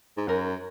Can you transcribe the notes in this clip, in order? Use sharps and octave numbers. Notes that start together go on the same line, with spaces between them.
G#2
F#2 A#4